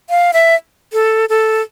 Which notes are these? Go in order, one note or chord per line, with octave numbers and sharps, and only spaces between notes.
F5
E5
A4
A4